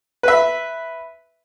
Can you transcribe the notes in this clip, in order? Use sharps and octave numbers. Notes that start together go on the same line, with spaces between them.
B4 E5